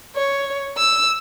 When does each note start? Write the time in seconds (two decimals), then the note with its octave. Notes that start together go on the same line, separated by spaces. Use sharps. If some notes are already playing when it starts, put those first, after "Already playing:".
0.15 C#5
0.78 E6